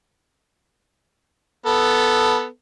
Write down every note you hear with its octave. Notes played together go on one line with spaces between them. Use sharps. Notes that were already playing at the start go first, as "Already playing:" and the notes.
B3 A4